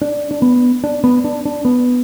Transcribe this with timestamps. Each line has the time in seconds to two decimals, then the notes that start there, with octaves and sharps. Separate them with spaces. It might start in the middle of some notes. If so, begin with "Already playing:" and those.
0.02 D4
0.31 D4
0.42 B3
0.84 D4
1.04 B3
1.24 D4
1.45 D4
1.65 B3